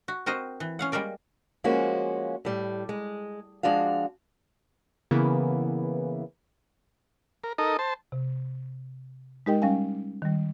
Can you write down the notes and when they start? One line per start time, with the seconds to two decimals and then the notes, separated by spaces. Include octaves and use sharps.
0.08 F#4
0.26 C4 F#4 A#4 C5 D#5
0.60 E3
0.79 C#4 F5 F#5
0.92 G3 G#3 A#3 A#4 D5
1.64 F3 G#3 A#3 C#4 F#4
2.45 A2 G3
2.89 G#3
3.63 F3 G#3 D4 F#4 F5
5.11 C#3 E3 A#3 B3 E4
7.44 A#4
7.58 D#4 A4 A#4 D#5
7.79 C5 A5
8.12 C3
9.46 G#3 D#4 G4 A#4 D#5 G5
9.62 G3 C#4 F5 G#5
10.22 D#3 G3